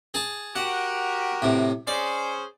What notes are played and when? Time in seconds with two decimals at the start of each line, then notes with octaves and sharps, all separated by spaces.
0.14 G#4 A5
0.56 F#4 G4 A#4 F#5
1.42 A2 C3
1.87 C#4 G#4 C5 D5